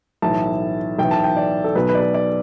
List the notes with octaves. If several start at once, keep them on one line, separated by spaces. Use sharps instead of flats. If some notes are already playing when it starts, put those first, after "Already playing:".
B1 A2 E3 A5
B1 A2 E3 G5
A5
G5
D5
A4
B1 B2 B4
B4
D5
B4
D5